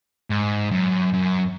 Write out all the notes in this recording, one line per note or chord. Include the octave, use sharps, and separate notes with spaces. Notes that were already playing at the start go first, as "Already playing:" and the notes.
G#2
F#2
F#2